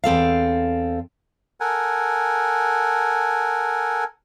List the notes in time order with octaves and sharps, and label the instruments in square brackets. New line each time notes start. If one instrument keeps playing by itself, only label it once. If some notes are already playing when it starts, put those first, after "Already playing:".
[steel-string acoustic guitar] E2 C4 A4 F5
[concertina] A4 A#4 F#5 G#5